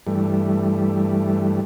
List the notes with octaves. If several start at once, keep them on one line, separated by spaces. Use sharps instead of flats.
G2 E3 G3 A3